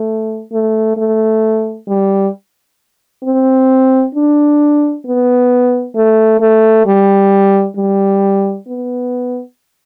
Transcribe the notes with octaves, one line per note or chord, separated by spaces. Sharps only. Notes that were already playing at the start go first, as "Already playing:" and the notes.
Already playing: A3
A3
A3
G3
C4
D4
B3
A3
A3
G3
G3
B3